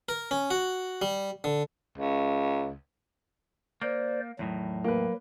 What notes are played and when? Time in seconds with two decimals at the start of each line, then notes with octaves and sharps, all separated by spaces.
0.09 A#4
0.31 C#4
0.51 F#4
1.02 G3
1.44 D3
1.98 C#2
3.82 A#3 C5 D5
4.39 E2 A2 D#3 F#3
4.84 A#3 B4